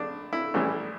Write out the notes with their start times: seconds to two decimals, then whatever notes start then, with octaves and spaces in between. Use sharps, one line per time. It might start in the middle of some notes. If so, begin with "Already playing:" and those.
Already playing: A#1 D4
0.33 E4
0.54 A#1 A2 E3 G3 C#4